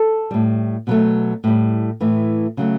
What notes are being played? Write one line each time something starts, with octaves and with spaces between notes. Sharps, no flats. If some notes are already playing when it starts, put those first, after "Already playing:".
Already playing: A4
A2 G3
B2 F#3 A3
A2 G3
A2 E3 A3
C#3 F#3 A3